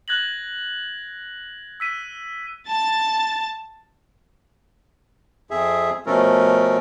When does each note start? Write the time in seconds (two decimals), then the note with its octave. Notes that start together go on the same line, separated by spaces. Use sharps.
0.08 F#6 G#6 A#6 F#7
1.80 E6 B6 D#7
2.67 A5 A6
5.51 F2 G#4 E5
6.06 B2 F3 A3 C#4 A4 A#4